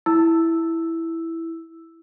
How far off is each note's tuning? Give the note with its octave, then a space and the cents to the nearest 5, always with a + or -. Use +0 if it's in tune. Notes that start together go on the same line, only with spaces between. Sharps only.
E4 +0 E6 +0